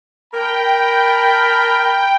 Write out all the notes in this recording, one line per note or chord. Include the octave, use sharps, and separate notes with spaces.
A#4 G5 A5 B5